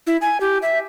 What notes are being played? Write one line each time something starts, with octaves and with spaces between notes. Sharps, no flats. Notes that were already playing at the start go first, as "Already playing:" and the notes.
E4
G#5
G4
E5